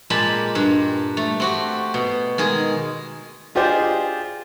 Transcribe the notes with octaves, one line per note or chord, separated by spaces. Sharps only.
A#2 G#3 G4 A5 B5
G2 G4
A3
C4 F#4 G4
B2
D#3 G#3 G#4
D4 F4 G4 G#4 C5 D#5